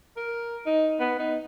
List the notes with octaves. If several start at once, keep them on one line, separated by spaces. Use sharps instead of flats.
A#4
D#4
B3
D#4